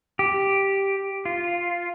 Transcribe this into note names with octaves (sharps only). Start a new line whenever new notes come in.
G4
F4